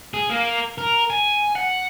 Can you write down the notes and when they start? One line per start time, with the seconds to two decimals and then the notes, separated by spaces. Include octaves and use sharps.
0.14 G#4
0.30 A#3 A#4
0.78 A#4
1.10 G#5
1.55 F#5